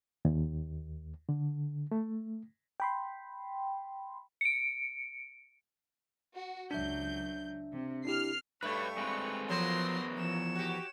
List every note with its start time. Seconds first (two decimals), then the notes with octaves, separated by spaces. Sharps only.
0.25 D#2
1.29 D3
1.91 A3
2.80 G5 B5 C6
4.41 C#7 D7
6.36 F#4
6.71 C#2 F#3 D4 E5 G6
7.73 C3
8.05 D4 E4 G4 F6 C7
8.63 G2 A3 B4 C#5 C#6
8.98 G#3 C4 B4
9.50 E2 F3 F#3 B3 A#4 C5 C6 A#6
10.17 F3 C#5 E7
10.55 F#4 G4